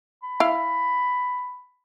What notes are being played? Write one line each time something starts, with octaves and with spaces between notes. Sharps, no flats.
B5
E4 F5